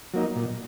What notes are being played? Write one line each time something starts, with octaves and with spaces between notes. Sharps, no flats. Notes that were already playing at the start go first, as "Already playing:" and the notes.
F#3 A#3 D#4
A#2